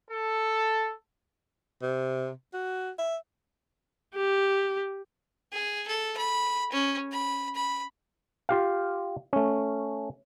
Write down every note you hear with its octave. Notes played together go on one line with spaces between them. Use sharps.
A4
C3
F#4
E5
G4
G#4
A4
B5
C#4
B5
B5
F4 G4 F5
A3 C#4